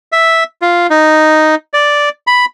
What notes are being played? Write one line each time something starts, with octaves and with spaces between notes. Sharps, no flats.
E5
F4
D#4
D5
B5